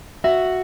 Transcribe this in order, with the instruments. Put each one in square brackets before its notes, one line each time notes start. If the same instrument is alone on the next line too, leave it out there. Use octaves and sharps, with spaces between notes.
[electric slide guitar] F#4 [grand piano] E5